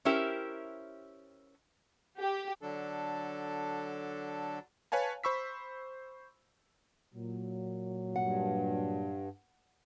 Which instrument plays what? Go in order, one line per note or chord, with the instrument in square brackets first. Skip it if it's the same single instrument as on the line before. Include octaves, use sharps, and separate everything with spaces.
[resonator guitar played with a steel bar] C#4 E4 G4 A#4 C5 E5
[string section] G4
[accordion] D3 F#3 D4 A4
[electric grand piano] B4 C#5 F5 G#5 A5
C5 B5 C#6 E6 B6
[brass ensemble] A#2 F#3
[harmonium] G2 [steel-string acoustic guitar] F#5